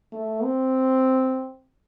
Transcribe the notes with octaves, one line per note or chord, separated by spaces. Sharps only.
A3
C4